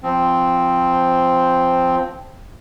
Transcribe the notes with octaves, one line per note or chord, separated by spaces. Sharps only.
F3 C4